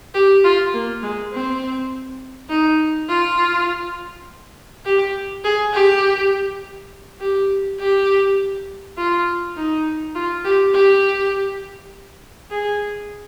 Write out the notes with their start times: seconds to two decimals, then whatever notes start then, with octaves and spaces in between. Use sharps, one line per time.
0.14 G4
0.44 F4
0.74 A#3
1.03 G#3
1.33 C4
2.49 D#4
3.09 F4
4.85 G4
5.44 G#4
5.74 G4
7.20 G4
7.80 G4
8.97 F4
9.56 D#4
10.15 F4
10.44 G4
10.74 G4
12.50 G#4